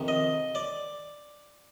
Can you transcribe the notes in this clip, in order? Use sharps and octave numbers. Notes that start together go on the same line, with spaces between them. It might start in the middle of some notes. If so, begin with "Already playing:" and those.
Already playing: F2 C3 D#3
D#5
D5